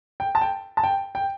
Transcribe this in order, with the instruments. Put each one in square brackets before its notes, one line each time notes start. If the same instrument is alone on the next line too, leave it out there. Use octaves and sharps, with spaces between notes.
[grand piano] G5
A5
G5
A5
G5
G5